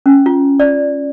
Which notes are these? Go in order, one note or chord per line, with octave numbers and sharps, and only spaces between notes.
C#4
F4
D5